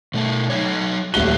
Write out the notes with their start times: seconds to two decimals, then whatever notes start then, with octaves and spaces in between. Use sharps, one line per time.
0.14 B2 A3
0.50 F#3 D#4 C#5
1.14 D#1 F#3 A3 F#4 G7